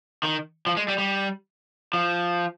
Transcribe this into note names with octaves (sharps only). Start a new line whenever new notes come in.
D#3
F3
G#3
G3
G3
F3